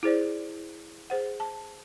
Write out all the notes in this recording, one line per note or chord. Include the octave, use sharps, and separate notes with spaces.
E4 G#4 C5 D5
G#4 C5 F#5
A5